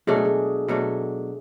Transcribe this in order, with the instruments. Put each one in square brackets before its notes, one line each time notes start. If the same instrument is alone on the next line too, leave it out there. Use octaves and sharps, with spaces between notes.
[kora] B2 F#3 A3 D4 [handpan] G#4
[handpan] A4
G#4
[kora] B2 F#3 A3 D4